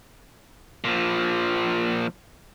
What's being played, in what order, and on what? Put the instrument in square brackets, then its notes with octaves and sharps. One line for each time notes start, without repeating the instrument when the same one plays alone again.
[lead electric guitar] A#2 F3